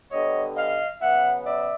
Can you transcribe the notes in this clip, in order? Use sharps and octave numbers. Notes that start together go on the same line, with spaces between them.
D3 G3 B3 C#5 D#5
D#5 F5
C#3 F#3 B3 E5 F#5
D5 E5